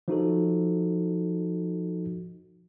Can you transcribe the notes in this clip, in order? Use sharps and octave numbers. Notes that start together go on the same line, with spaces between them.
F3 D#4 F#4 A4